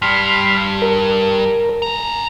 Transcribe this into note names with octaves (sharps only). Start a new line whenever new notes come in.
G2 G3 B5 C6 F6
A#4
C#3 A#5